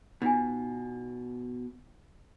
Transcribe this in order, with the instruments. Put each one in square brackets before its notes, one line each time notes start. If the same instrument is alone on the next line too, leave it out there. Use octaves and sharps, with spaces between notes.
[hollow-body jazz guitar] B2 [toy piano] D#4 F4 G#5